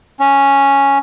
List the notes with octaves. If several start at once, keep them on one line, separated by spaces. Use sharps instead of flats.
C#4